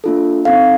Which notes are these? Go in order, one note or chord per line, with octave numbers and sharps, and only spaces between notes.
A#3 D4 F4 A4
C4 D#4 A4 F5